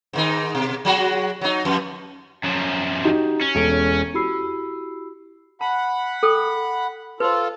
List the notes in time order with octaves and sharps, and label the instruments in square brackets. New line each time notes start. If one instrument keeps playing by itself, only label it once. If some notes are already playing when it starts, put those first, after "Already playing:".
[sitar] G#2 D#3 D#4
B2
F#3 G#3 F#4
F#3 D#4
F2
[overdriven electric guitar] F#2 F3
[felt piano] D#4 F#4 G4
[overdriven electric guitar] C#4
[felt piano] E1 A4 D7
[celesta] E4 F#4 G4 B5 E6 C7
[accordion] F#5 B5 [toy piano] A5
[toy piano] A4 G5 D#6
[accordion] F4 A4 [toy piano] B4 C5